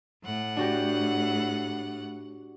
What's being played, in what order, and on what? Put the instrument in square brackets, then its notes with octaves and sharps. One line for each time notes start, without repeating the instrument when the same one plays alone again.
[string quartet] A2 F#5
[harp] D4 F#4 G4